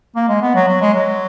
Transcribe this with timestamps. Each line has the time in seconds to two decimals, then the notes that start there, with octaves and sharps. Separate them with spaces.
0.16 A#3
0.29 G#3
0.42 B3
0.55 F#3
0.68 F#3
0.81 G#3
0.95 F#3